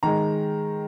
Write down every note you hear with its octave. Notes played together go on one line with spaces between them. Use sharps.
D#3 G#3 A#5